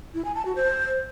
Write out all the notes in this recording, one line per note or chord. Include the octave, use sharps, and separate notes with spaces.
E4
G#5
A5
F#4
C5